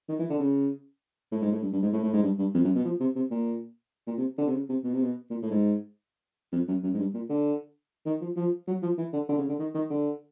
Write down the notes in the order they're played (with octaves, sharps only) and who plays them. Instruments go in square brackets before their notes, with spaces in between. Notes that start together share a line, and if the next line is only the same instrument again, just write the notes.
[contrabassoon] D#3
E3
D3
C#3
A2
G#2
A2
G2
G2
G#2
A2
A2
G#2
G2
G2
F2
F#2
B2
F3
C3
C3
A#2
A#2
C3
D3
C3
C#3
C3
B2
C3
B2
A#2
A2
G#2
F2
F#2
F#2
G#2
G2
A#2
D3
D#3
F3
F3
F#3
F3
E3
D3
D3
C#3
D3
D#3
D#3
D3